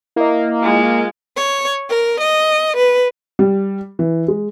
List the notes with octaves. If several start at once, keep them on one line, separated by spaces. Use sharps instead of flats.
A#3 E4 D#5
G#3 F4
C#5
A#4
D#5
B4
G3
E3
G#3